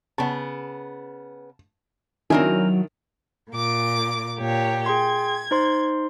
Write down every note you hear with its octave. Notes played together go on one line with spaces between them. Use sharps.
C#3 B3 A5
D#3 F#3 C4 D4 E4 A#4 G#5
A#2 D6
A#2 G4 C#5
G#4 G5 C6 G#6
D#4 C5 C6